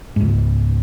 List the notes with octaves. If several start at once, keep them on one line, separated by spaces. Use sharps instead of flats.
C#2 G#2